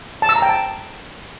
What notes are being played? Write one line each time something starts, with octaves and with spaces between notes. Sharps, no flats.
A5
E6
A#5
G5
A5